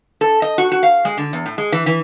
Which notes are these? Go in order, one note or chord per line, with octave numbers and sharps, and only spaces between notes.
A4
D#5
F#4
F#4
F5
G#3
D3
E2
A2
G#3
E3
E3